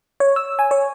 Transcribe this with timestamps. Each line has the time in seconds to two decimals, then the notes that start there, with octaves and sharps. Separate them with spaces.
0.20 C#5
0.36 E6
0.59 G#5
0.71 C#5